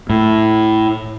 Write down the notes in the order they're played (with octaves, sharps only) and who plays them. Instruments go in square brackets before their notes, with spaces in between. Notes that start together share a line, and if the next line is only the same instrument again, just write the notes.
[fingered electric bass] A2